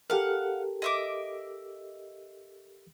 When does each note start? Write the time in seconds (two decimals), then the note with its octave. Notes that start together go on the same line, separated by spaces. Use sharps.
0.10 G4 A4 A#4 F5 F#5
0.82 D#5 E5 D6